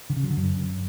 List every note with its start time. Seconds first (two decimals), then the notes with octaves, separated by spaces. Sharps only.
0.10 D3
0.16 C#3
0.23 F#3
0.30 D3
0.37 F#2